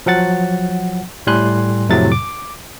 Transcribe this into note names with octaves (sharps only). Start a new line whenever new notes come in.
F3 F#3 F#5 A6
A2 G3 G#5 C6 F#6
F2 A2 C3 F#3 A6
D6